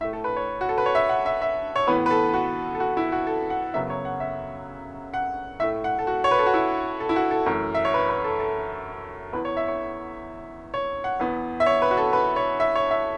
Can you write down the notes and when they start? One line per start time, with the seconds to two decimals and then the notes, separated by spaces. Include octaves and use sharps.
0.01 A2 E5
0.04 A3
0.13 A4
0.24 B4
0.36 C#5
0.61 F#4
0.69 A4
0.78 B4
0.86 C#5
0.95 E5
1.09 F#5
1.26 E5
1.42 E5
1.76 C#5
1.87 A2 E3 B3 B4
2.06 B4
2.11 A4
2.34 F#4
2.75 A4
2.80 F#4
2.97 E4
3.12 F#4
3.27 A4
3.50 F#5
3.74 F#2 C#3 F#3 B3 E5
3.90 C#5
4.05 F#5
4.20 E5
5.14 F#5
5.60 A2 A3 E5
5.84 F#5
5.99 A4
6.07 F#4
6.24 C#5
6.31 B4
6.39 A4
6.46 F#4
6.54 E4
7.00 A4
7.09 E4
7.16 F#4
7.31 A4
7.46 F#2 E3 A3
7.75 E5
7.85 C#5
7.94 B4
8.09 B4
8.24 A4
8.40 A4
9.33 E2 E3 B3 B4
9.45 C#5
9.57 E5
9.68 C#5
10.74 C#5
11.04 F#5
11.20 E2 E3 B3
11.60 E5
11.66 C#5
11.82 B4
11.91 F#4
11.97 A4
12.13 B4
12.36 C#5
12.60 E5
12.75 C#5
12.91 E5